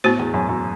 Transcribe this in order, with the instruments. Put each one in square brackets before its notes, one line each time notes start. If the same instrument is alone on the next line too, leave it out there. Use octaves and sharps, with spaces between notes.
[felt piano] A2 [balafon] B3 F#4 C5
[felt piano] E2
F#2
F#2